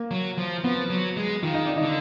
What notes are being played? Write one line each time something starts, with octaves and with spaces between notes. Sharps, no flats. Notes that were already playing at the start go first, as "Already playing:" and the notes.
Already playing: A#3
F#3
F3
F3 B3
F#3
G#3
D#3 F4
D#4
D4
D#4
D3